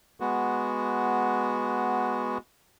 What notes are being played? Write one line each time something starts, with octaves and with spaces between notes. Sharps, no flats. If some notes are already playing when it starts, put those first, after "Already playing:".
G#3 B3 F#4